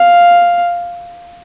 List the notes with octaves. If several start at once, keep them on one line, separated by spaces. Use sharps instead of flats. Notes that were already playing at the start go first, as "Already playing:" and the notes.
Already playing: F5